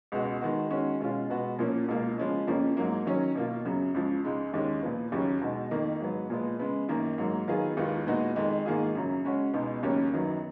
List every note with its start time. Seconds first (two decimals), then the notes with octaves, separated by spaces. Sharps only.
0.12 C#2 B2 G#3 B3 F#4
0.41 D#3 G#3 B3 F#4
0.70 D#3 G#3 C#4 F#4
1.00 B2 G#3 C#4 F4
1.30 B2 G#3 B3 F#4
1.59 A#2 F3 A#3 C#4
1.88 C#2 B2 A#3 F4
2.18 C#3 F3 G#3 C#4
2.47 F2 C#3 F3 A#3 C#4
2.77 G#2 F#3 A#3
3.06 D#3 F#3 C#4
3.35 B2 A#3 F4
3.65 F#2 C#3 F#3
3.94 C#2 C#3 F3
4.23 C#2 C#3 G#3 D#4
4.53 D#2 D#3 G#3 C#4
4.83 A#2 F3 B3
5.12 D#2 C#3 F#3 C#4
5.41 B2 G#3 D#4 F#4
5.71 F2 D#3 A#3
6.00 G#2 F#3 B3
6.30 A#2 F3 G#3 B3
6.59 C#3 G#3 B3
6.89 F#2 D#3 A#3 D#4
7.18 G#2 F#3 A#3
7.48 D#3 F#3 B3 F4 G#4
7.77 D#2 D#3 G#3 B3 F4
8.07 A#2 G#3 B3 D#4 F#4
8.36 F2 D#3 G#3
8.66 G#2 D#3 A#3 F4 G#4
8.95 F#2 C#3 F#3
9.24 C#3 G#3 C#4 F#4
9.53 C#2 B2 G#3 B3 D#4
9.83 D#2 C#3 F#3 A#3 C#4
10.13 F#2 D#3 F#3 B3